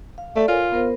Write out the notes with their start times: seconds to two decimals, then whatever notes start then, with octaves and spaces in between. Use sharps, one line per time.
0.18 F5
0.36 A3 A4 D5
0.48 F4 A#4 C#5 G#5
0.72 B3 A#4 C5